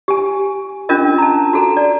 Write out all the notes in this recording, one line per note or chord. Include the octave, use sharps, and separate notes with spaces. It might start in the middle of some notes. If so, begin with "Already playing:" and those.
G4 G#5
C#4 D4 F4 A#4 D#5
A5 A#5
F#4 A4 A#5
D5